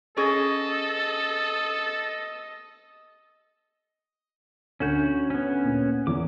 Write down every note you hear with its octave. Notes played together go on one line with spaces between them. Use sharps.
C#4 G#4 A4 D#5
D2 C#4 F#4 G6
B3 C#4
A#2
E2 D6